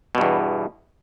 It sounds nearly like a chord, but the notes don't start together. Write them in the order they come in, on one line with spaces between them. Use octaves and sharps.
B2 G2 E2